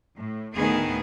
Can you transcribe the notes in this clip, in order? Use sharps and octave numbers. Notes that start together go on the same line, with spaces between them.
A2
D2 A2 D#3 B3 G#4